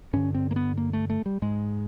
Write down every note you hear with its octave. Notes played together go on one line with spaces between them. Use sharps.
G2 D3 C#4
C4
A#3
B3
A#3
A3
A3
G3
G#2 G#3